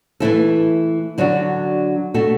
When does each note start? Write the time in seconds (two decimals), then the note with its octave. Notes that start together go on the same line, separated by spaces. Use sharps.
0.20 E3 A3 E4 A4
1.18 D3 F#3 D4 F#4
2.14 B2 A3 F#4 A4